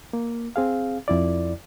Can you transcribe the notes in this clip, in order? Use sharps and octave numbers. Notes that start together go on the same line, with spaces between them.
A#3
C4 G#4 F5
F2 E4 D5